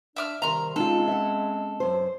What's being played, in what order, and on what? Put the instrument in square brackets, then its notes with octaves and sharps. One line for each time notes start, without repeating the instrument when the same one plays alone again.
[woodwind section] D4 [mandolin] E5 D6 F6
[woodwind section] C3 D#3 G3 [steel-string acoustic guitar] A#4 E5 [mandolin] A#5 C6
[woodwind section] G#3 C4 C#4 [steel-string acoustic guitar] D#4 F4 [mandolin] A4
[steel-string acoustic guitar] E5 F#5
F#2 C5